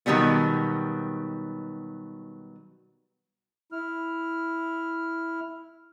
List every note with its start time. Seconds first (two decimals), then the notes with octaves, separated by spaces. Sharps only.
0.06 B2 D#3 F#3 G3 B3
3.72 E4 F6